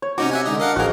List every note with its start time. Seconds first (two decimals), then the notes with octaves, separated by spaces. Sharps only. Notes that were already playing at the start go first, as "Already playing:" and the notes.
0.02 C#5
0.18 C3 C#4 D#4 F#4 D6
0.31 E5 F#5 G#5
0.46 D3 G#3 D#4 D#5
0.59 D4 A#4 D#5 F5 F#5
0.76 A1 F3 D#4 F#4 G#4 A#4